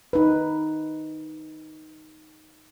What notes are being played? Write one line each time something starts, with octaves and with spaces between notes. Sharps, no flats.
D#4 B4